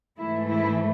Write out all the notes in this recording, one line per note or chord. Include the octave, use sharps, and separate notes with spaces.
G#2 E3 A3 E4
E4